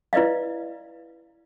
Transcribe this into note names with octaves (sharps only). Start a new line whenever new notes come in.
E4 B4 D5 D#5 F5